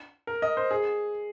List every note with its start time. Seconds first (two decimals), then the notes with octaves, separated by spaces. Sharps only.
0.27 A#4
0.42 D#5
0.57 C5
0.71 G#4